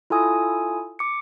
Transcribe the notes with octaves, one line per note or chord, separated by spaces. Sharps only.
E4 F4 A4 G#5 D#6
D6 C#7